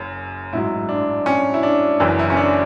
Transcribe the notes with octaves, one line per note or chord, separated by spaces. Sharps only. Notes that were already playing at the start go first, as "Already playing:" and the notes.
Already playing: F#1 F#2
A1 G#2 F#3 E4
D4
C#4
E4
D4
F#1 F#2 E3
E4
C#4
D4